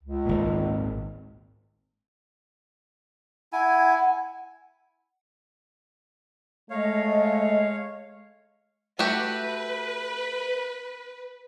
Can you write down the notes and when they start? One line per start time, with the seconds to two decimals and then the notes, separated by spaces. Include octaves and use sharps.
0.04 C#2
0.25 G#1 A#2
3.53 E4 F#5 G#5
6.70 G#3 A3 C#5 D#5 F5
8.99 A3 F#4 G4 B4